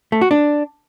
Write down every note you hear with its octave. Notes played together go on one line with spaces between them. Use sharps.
A3
F#4
D4